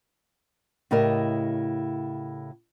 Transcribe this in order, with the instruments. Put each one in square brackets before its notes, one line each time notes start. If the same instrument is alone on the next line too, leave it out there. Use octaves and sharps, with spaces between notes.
[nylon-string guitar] A2 C#3 E4 G4 A#4 D#5